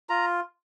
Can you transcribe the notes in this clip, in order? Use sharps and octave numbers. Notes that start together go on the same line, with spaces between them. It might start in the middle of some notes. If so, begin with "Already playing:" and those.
F4 A#5